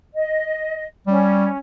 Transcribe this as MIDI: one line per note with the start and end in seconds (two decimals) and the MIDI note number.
0.14 0.85 75
1.07 1.49 55
1.07 1.57 61